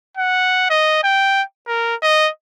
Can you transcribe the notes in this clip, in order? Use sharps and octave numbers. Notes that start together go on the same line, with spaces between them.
F#5
D#5
G5
A#4
D#5